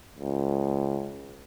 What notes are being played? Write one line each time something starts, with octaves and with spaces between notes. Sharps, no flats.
C#2